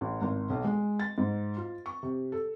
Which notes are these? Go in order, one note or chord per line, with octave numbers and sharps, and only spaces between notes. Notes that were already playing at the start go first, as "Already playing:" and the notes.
A1
G#1
B1
G#3
A6
G#2
F4
C#6
C3
A4